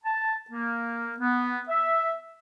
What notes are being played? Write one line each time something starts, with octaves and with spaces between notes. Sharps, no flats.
A5
A#3
B3
E5